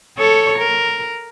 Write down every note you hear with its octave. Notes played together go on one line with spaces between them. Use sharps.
A4 C#5
A#4